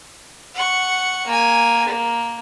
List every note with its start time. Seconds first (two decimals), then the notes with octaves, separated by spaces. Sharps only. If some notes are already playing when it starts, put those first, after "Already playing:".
0.55 F#5 C#6
1.27 A#3 G#5
1.88 A#3